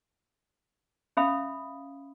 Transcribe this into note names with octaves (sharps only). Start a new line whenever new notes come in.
C#4 E5 F5 B5 D#6